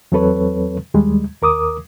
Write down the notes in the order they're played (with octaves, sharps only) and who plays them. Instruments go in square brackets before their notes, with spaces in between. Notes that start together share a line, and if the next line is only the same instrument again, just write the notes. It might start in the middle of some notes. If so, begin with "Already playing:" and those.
[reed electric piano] E2 F#3 C4 A4 B4 C#5
D#2 G3 G#3
D#2 A#4 D6 D#6